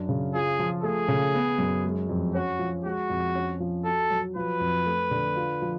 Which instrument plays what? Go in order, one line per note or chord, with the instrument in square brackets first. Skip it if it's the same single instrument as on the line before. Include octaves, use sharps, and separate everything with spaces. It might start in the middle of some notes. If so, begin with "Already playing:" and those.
Already playing: [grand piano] F#2 D4
C#3
[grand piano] F4 [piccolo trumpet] G#4
[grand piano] F3
[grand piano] A3 [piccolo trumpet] G#4
[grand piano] C#3
B3
F#2
G#3
F2
[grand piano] C#4 [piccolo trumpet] F#4
[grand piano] F3
[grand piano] G#3 [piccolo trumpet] F#4
[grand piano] F2
C#4
F3
[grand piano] F#4 [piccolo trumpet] A4
[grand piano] F#3
[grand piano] F3 [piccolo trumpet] B4
[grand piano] F2
A3
D3
F4
F3